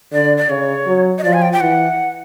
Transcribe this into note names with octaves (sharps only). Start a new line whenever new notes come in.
D3 D5
D5
C#3 C#5
F#3
D#5
F3 D5
G#5
G5
G5
E3 F#5